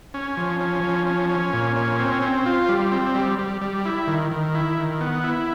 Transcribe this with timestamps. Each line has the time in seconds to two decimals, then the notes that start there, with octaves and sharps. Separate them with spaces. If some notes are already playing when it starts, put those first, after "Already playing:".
0.14 C#4
0.37 F3
0.60 C#4
0.84 F3
1.07 C#4
1.29 C#4
1.53 A#2
1.76 C#4
1.99 C4
2.22 C4
2.46 F4
2.69 G3
2.92 C4
3.15 G3
3.39 G3
3.61 G3
3.86 E4
4.08 D#3
4.31 D#3
4.55 E4
4.78 D#3
5.01 B3
5.24 E4